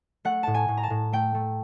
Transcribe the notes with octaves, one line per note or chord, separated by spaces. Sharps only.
A3 F#5
A2 A5
G#5
A2
A#5
A5
A2
A3 G5
A3